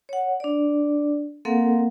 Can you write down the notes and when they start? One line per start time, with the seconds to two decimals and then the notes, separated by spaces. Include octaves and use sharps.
0.09 C#5 F#5
0.40 D4 D5
1.45 A#3 C4 A4 A#4 F5 F#5